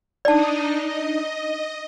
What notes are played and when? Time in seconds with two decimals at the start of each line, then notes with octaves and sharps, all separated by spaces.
0.25 D4 D#4 D5 D#5 A5
0.86 D#5